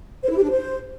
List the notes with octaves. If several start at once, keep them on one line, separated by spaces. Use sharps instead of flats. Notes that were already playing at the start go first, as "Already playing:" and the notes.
C5
E4
G4
D4
C5